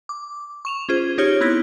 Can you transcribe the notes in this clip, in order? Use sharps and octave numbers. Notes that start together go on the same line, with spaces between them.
D6
C#6 E7 F7
C#4 F4 G#4 C5
D#4 G4 C#5 F6 G#6 G7
B3 C4 E4 G#6 A#6